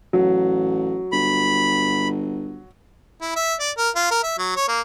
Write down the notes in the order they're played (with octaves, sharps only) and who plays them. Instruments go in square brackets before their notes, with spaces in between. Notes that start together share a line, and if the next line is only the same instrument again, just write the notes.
[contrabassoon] A1 [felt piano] F#3
[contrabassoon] G1 [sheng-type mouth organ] B5
[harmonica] E4
E5
D5
A#4
F4
A#4
E5
F#3
C#5
A#3